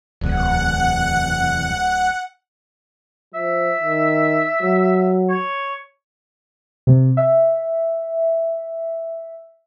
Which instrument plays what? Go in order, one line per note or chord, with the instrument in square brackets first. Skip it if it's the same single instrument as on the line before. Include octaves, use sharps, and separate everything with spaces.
[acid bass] D1 [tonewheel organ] E2 C3 E3 [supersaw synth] F#5
[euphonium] F3 [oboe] E5
[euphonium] D#3
F#3
[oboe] C#5
[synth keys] C3
E5